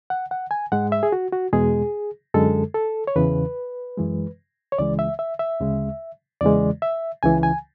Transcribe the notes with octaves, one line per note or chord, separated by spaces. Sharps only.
F#5
F#5
G#5
G#2 G#3 F#5
E5
G#4
F#4
F#4
E2 B2 G#3 G#4
F#2 D3 G#3 A4
A4
C#5
E2 C#3 E3 B4
F#2 E3 G#3
C#5
C#2 C#3 E3 G#3 D5
E5
E5
E5
D2 C#3 G#3
E2 C#3 E3 G#3 D5
E5
C#2 C#3 E3 G#5
G#5